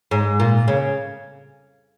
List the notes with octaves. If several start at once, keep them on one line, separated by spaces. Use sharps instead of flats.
G#2
A#2
C#3